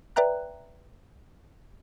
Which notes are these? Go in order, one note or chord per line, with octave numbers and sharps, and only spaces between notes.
B4 D5 E5 G5 A#5 F#6